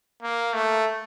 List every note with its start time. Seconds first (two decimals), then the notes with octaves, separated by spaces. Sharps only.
0.22 A#3
0.53 A3